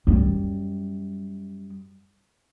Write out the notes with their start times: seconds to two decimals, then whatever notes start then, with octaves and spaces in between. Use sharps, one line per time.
0.07 F#2 G3